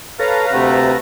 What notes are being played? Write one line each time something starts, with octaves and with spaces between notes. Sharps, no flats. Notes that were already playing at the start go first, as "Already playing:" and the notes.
A4 B4 C#5 F5 A5 A#5
D2 C3 A3 F5 F#5